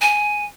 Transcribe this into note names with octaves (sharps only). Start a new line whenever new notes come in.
G#5